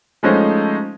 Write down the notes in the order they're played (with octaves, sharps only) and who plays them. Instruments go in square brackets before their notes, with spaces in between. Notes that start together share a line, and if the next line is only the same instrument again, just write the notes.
[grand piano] F3 G#3 A3 C#4 D#4 C5